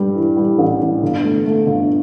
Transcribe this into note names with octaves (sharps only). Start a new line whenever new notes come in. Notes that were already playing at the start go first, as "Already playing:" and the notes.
Already playing: G2 G3
E3
G3
A1
A1
G1
A3
A3
G1